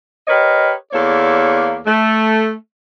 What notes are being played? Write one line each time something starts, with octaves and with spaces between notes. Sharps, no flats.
G4 A#4 B4 C#5 D#5
E2 A#3 A4 C#5 D5
A3